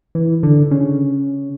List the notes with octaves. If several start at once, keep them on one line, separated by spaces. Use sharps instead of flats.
E3
D3
C#3